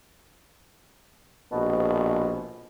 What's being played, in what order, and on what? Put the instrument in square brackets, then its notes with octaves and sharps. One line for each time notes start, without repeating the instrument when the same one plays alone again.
[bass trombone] A#1 [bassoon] B2